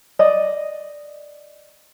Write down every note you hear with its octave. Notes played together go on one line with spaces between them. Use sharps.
D5 D#5